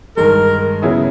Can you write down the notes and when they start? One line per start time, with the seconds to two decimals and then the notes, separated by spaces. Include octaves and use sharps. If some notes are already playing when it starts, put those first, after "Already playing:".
0.17 G2 D#3 G#3 A#4
0.82 C#3 F#3 B3 E4 G#4